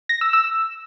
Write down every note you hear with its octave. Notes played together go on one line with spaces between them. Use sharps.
A#6
E6
E6